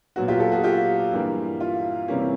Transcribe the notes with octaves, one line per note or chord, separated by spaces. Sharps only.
A#2 F#3 B3 F#4
F4 G4
G4 A4
F#4 G#4
F4 G4
G2 E3 G3 A#3
F4
C3 E3 G3 A#3 C#4